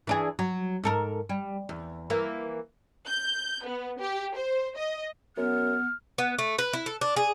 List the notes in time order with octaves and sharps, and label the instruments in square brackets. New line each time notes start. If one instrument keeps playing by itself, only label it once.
[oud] E3 D4 G#4
F#3
G#2 A4 A#4
G3
E2
E3 A#3
[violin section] G6
B3
G4
C5
D#5
[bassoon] F#2 [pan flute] B3 [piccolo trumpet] F6
[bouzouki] B3
A3
B4
E4
A4
D4
G#4